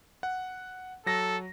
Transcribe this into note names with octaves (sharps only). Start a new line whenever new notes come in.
F#5
F#3 A4 A#6